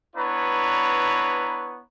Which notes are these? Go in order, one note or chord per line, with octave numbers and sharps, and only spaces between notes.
B3 D4 E4 B4 C#5 A#5